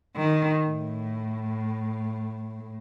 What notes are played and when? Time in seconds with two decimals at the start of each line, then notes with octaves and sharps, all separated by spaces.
0.16 D#3
0.65 A2